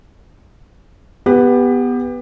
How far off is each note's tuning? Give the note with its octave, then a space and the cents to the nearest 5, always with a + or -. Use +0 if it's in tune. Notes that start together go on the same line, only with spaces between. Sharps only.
B3 +0 G4 +25